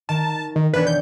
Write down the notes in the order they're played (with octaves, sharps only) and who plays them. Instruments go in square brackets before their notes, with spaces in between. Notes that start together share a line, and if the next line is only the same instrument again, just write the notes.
[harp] D#3 [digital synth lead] A5
[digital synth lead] D#3
[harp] E1 D4 C#5 [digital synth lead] B4
[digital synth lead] G6